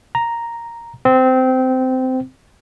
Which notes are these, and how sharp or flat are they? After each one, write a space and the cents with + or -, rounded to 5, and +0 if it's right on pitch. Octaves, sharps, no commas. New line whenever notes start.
A#5 +0
C4 -20